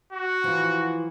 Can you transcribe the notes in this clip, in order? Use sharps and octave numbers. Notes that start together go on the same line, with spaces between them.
F#4
E3 F3